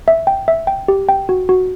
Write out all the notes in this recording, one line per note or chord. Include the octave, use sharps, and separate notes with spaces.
E5
G5
E5
G5
G4
G5
F#4
F#4